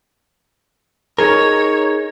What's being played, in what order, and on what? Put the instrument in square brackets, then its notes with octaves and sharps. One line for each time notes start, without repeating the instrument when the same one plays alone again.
[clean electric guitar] D#4 G#4 A#4 [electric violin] C#5